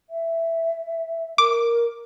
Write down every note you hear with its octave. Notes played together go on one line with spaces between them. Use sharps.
E5
A#4 D6